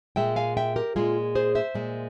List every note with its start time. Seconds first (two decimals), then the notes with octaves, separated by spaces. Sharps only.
0.16 A#2 G#3 E5 G5
0.36 F5 G#5
0.57 E5 G5
0.76 G4 A#4
0.96 A#2 G#3 F4 G#4
1.35 G#4 C5
1.55 C5 E5
1.75 A#2 G#3